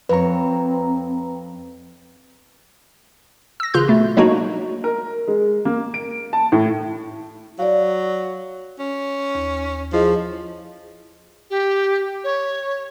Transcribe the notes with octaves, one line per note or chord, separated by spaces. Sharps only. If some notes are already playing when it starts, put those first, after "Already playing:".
F2 C4 B4 C#5 A#5
E6 A#6
A1 C#3 F4 C6 F#6 G6
B2 A3
F#3 G#3 A#3 D4 D#4 F#4
A#4
G#3
A#3
D7
A5
A2
F#3 D5 F5
C#4
D#2
F3 E4 G#4 D#5
G4
C#5